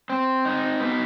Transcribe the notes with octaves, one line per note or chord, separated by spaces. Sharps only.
C4 C5
D#4
B2 B4